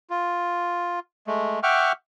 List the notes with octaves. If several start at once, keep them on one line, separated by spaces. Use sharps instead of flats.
F4
G#3 A3
E5 F#5 G5 C#6 D6 F6